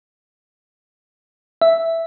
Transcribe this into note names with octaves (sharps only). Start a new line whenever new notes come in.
E5